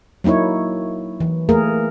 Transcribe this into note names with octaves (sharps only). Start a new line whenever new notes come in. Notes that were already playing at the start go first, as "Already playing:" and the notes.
F#3 A#3 D#4 E4 C#5
E3
A3 A#3 G#4 A#4